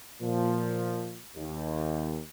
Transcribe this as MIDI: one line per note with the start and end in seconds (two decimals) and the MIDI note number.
0.21 1.18 46
0.21 1.18 53
1.35 2.20 39